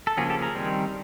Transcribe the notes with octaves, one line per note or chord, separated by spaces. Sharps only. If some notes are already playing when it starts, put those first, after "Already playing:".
A4
C#3 F3 A#3 C#4 F#4 G#4
G4 A4
G#4 A#4
D#3 G3 C4